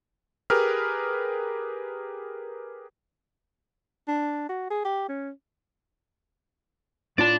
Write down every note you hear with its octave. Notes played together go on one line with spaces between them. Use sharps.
G4 G#4 A#4 B4 F6
D4
F#4
G#4
G4
C#4
A2 D4 F4 D5 A5